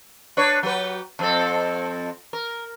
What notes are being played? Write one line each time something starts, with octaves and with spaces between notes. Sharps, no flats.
D4 B4 C#5
F#3 G4 B4
F2 C4 A4
A#4